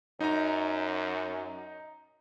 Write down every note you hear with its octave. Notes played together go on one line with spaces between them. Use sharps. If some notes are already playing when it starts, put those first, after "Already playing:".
F#2 D#4 A#5